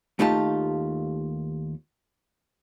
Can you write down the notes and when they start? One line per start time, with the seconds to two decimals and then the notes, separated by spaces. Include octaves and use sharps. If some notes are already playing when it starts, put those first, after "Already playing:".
0.19 D#2 A3 D#4 F4 G4 A5